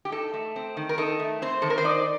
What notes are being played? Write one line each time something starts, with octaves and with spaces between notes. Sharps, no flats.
G4
D#4 A4
A3
C4
D#3
A#4
D#4 A4
A3
C4 C5
D#3 A4
A#4
C5
D#4 D5